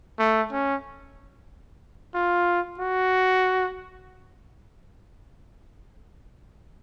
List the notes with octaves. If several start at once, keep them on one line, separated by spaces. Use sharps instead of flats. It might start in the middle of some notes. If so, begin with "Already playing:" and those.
A3
C#4
F4
F#4